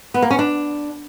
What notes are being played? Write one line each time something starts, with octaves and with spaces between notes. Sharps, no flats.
B3
A#3
C#4
D4